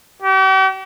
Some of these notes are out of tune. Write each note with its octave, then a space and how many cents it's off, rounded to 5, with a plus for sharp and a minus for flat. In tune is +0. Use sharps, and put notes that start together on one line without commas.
G4 -45